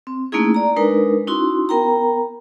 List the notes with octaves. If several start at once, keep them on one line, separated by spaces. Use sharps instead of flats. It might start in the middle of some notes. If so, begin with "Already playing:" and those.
C4
A3 A#3 C#4 D#4 E4 G#4
D5 A#5
G#3 D4 D#4 A#4 B4
C#4 D#4 E4 F#4 C6
B3 A#4 G5 A#5